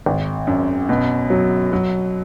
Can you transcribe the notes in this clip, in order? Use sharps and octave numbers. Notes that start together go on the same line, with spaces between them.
G#1
F#2
B2
F#3
F#3